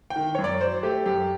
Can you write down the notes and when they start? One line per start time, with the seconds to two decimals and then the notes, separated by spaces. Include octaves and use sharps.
0.10 G5
0.16 D#3
0.35 F#2 C#5
0.44 D5
0.61 F#3 C5
0.83 A3 G4
1.06 F#2 G4